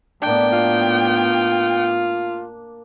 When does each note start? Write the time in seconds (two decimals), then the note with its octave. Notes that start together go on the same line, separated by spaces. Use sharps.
0.22 A2 A#3 B3 D4 G5
0.53 F4